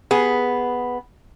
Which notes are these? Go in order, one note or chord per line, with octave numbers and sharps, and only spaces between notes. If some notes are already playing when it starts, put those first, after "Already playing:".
B3 G#4